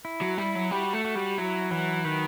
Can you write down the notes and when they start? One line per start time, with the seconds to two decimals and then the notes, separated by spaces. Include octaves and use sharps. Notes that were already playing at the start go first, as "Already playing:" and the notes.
0.05 E4
0.21 F#3
0.38 G3 E4
0.55 F#3
0.71 G3 F#4
0.93 A3
1.05 F#4
1.15 G3
1.38 F#3 E4
1.71 E3 F#3
2.05 D#3 B4